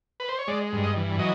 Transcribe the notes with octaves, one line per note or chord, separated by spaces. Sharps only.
B4
C5
C#5
G#3 D5
G2
D#5
E3
F#3 D#5